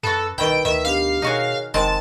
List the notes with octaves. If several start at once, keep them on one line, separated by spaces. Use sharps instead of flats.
F#2 B3 F#4 A4
C2 B2 D#3 E4 B4 G5
D2 D#3 E5
B3 D4 G4 F5
B2 D#4 F#4 G#4 A#4 C#5 G#5
F1 D#3 G#3 C4 A5 C6